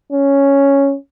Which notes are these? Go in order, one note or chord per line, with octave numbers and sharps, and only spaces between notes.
C#4